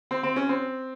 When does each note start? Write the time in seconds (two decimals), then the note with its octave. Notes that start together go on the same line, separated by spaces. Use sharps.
0.11 C4
0.23 C4
0.36 C#4
0.49 C4